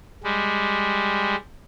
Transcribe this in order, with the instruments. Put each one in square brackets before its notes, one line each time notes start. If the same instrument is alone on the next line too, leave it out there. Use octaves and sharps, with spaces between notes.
[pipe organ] G3 G#3